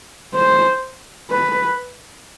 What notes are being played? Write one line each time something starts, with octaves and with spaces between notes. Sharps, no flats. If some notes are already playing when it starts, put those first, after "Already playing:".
C5
B4